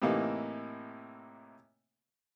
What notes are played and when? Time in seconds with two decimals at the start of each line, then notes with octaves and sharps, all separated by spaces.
0.02 A2 C3 E3 A#3 D#4